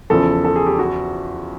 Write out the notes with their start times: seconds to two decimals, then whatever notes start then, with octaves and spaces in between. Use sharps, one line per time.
0.10 E2 C#3 F3 A4
0.44 A4
0.56 G#4
0.66 G4
0.79 F#4